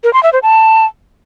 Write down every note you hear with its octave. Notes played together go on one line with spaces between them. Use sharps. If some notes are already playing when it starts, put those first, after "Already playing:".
A#4
C6
E5
C5
A5